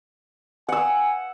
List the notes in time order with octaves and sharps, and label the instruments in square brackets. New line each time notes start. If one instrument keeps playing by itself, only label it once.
[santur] F#5 E6 [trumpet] G#5